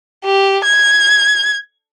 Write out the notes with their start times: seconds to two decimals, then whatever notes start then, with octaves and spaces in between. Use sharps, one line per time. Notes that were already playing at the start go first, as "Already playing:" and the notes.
0.24 G4
0.65 G#6